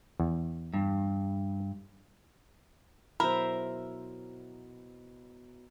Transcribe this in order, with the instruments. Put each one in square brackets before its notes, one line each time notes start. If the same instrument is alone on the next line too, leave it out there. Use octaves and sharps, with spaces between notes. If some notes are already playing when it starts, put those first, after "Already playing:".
[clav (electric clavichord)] E2
[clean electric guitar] G2
[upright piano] B2 F#3 E4 [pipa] A#4 [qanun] C5 E5 [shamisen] B5